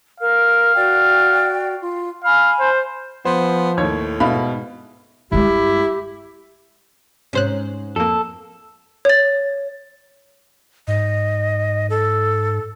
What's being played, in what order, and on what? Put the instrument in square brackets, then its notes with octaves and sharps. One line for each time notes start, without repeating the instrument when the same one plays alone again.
[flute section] A#4 [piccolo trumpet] F5
[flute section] F#4 D5 G5
F4
[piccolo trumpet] F5 [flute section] G#5 B5
[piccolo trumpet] C5
[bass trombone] F3 [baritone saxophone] B3 [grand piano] C5
[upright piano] D#2 C#5 G#6 [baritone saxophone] A2
[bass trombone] G#2 [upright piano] B2 F5 [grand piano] E5 B5
[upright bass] G2 G#3 [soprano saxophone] E4 [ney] G4
[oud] G#2 C#4 [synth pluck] C3 C5 F#6
[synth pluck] F2 A#3 [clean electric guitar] A4
[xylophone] C#5 A6
[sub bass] G#2 [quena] D#5
[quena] A4